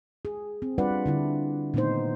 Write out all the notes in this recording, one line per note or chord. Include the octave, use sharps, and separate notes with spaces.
G#4
C4
G3 D4 F4 B4 D5 F#5
D3 D4 E4
A#2 D#3 A3 B3 D#4 C5